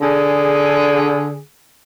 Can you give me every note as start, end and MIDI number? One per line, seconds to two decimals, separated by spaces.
0.01 1.39 50
0.01 1.39 68